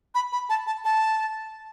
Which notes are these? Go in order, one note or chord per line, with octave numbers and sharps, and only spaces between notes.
B5
B5
A5
A5
A5